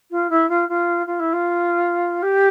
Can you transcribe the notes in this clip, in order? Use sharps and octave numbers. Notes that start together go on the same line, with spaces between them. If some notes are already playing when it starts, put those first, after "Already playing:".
F4
E4
F4
F4
F4
E4
F4
G4